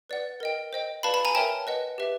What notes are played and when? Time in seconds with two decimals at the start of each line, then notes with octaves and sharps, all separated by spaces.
0.09 B4 D5 F#5
0.40 A#4 D#5 G5
0.73 C5 D#5 G5
1.03 B4 D5 F5 A5 B5
1.14 A5 B5
1.25 G#5 A#5
1.35 A#4 C#5 E5 G5 A5
1.67 B4 D#5 F#5
1.98 G4 B4 E5